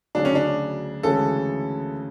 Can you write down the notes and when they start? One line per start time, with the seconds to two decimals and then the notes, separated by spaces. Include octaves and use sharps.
0.15 D2 C#3 F#3 D4
0.25 C#4
0.35 D4
1.03 D2 C#3 E3 G#3 C#4 A4